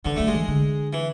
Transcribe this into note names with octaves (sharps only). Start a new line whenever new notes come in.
D3 E3
F#3 A3
G#3
E3
D3
E3